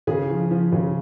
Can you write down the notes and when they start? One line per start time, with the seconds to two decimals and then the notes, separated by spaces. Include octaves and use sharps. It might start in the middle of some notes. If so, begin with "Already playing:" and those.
0.07 C#3 G#4
0.29 F3
0.51 F3
0.72 C#3